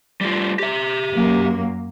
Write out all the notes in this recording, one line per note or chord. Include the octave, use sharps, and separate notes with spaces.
G3 A3 F4
G4 E5
F#2 F#3 A#3